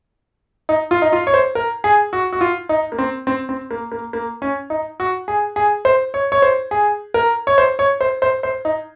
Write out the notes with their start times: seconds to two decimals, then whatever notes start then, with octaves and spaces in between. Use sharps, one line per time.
0.69 D#4
0.91 F4
1.02 D#4
1.13 F4
1.27 C#5
1.34 C5
1.55 A#4
1.84 G#4
2.13 F#4
2.33 F#4
2.41 F4
2.69 D#4
2.92 A#3
2.98 C4
3.27 C4
3.49 C4
3.71 A#3
3.92 A#3
4.13 A#3
4.42 C#4
4.70 D#4
5.00 F#4
5.28 G#4
5.56 G#4
5.85 C5
6.14 C#5
6.32 C#5
6.42 C5
6.71 G#4
7.14 A#4
7.47 C#5
7.58 C5
7.79 C#5
8.01 C5
8.22 C5
8.43 C5
8.65 D#4